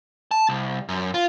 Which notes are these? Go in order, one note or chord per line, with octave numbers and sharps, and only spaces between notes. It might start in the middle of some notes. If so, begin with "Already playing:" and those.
A5
C2
F#2
F4